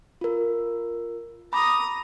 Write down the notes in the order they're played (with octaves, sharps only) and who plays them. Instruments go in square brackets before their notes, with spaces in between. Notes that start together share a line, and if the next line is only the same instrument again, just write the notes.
[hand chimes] F4 A#4
[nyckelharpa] A#5 D#6 [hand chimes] B5 D6